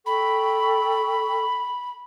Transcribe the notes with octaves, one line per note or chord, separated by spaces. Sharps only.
A4 G5 B5 C#6